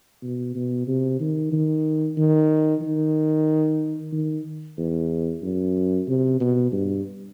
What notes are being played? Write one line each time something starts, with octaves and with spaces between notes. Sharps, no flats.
B2
B2
C3
D#3
D#3
D#3
D#3
D#3
E2
F#2
C3
B2
G2